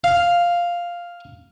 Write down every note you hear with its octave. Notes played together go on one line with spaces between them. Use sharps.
F5